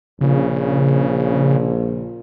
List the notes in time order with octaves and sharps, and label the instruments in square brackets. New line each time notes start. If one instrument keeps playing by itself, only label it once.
[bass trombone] A#1 [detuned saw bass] C#3